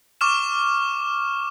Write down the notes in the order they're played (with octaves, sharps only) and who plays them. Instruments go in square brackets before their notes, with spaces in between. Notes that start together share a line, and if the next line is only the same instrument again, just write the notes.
[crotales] C#6 D6 F6 E7